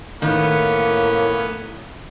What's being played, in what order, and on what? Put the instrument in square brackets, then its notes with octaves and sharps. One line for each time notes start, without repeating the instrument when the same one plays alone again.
[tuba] A2 [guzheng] D#3 [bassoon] A#3 [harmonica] B3 C#4